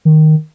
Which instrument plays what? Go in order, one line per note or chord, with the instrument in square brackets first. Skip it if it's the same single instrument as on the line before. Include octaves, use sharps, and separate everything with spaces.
[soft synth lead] D#3